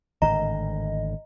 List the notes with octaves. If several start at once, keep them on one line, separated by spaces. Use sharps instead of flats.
G#1 A2 D3 D#5 A#5